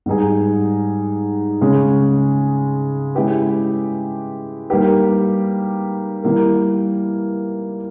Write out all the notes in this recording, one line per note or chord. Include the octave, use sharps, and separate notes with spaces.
G#2 G3 B3 D#4 G#4
C#3 G#3 C#4 G#4
G#3 C#4 E4 G4 B4
G3 A#3 D#4 G4 B4
E3 G3 A#3 E4 A#4